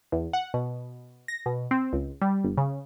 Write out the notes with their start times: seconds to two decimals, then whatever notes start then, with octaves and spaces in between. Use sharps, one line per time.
0.12 E2
0.33 F#5
0.54 B2
1.28 A#6
1.46 B2
1.71 C4
1.93 C#2
2.21 G3
2.44 G1
2.57 C#3